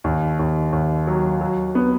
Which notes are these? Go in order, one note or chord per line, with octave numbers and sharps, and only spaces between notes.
D#2
D#2
D#2
F#3
F#3
B3